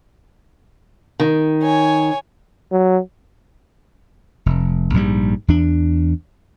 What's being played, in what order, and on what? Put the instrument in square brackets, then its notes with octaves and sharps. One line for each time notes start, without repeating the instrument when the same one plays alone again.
[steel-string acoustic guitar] D#3
[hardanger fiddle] C#5 G#5
[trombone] F#3
[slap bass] F1
A#1 G#2 E3 G3
E2 D4